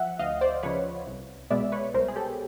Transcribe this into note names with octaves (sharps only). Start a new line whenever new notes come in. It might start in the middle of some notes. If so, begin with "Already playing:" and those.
Already playing: F3 E5 F#5
D2 D#5 F5
C5 D5
C#3 F3 B4 C#5
C2
B2 G#3 B3 D5 E5
B4 C#5
C2 A#4 C5
G#4
G4 A4